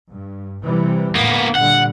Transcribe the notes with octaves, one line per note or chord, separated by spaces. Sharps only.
G2
C3 E3 G3
E2 A2 D3 A#3 B3
A#2 D3 G3 F#5